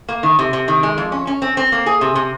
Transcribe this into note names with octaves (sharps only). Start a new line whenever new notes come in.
A#3
D#3
C3
C3
D#3
G#3
F2
C#4
C#4
C4
C4
A#3
G#4
C3
C3